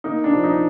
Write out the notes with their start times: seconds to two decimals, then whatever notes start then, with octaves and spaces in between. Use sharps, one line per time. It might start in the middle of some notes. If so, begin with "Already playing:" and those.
0.04 A#3 D#4
0.24 D4
0.33 F3
0.44 D#4